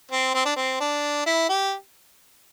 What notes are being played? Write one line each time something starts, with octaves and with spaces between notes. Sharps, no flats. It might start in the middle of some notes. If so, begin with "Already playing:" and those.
C4
C4
D4
C4
D4
E4
G4